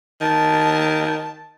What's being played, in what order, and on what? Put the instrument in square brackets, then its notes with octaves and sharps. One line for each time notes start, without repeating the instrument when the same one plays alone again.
[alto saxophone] D#3 [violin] A5